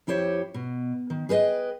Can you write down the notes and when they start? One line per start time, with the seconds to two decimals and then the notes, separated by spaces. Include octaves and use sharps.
0.07 F2 E4 G4 C5 C#5
0.54 B2
1.10 D#3
1.29 G#4 B4 C5 D#5 G5